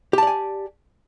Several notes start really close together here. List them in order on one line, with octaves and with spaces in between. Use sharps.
G4 A5 D5 G#5